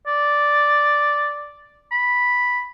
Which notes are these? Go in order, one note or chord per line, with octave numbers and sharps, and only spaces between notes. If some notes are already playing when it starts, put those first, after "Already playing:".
D5
B5